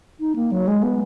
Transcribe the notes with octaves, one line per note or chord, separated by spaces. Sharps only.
D#4
A#3
F#3
G#3
B3